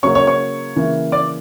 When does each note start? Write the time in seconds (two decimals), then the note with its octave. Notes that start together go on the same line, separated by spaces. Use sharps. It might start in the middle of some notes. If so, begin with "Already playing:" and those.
0.03 C#3 F#3 A#3 C#5 C#6
0.15 C#5 C#6
0.27 C#5 C#6
0.76 C#3 E3 A#3
1.12 D5 D6